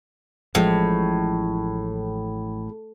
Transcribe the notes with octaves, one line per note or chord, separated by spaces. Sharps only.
A1 A2 F3 G#3